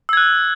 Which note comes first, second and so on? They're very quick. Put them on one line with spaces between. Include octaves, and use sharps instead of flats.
E6 G#6 F#6